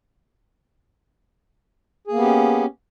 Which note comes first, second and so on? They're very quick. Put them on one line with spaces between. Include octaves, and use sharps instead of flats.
G#4 A#3 B3 G4 C#4